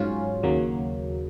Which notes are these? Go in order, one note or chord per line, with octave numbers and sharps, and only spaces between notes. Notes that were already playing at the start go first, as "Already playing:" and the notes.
Already playing: G#2 F#3 C#4 F4
D#2 C#3 F#3 A#3